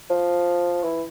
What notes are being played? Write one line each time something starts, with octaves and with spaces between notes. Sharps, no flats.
F3
E3